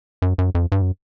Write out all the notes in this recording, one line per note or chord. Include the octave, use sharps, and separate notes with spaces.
F#2
F#2
F2
G2
F#2